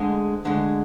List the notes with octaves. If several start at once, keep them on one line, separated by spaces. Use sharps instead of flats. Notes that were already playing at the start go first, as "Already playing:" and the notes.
Already playing: D2 D3 G#3
D2 D3 G#3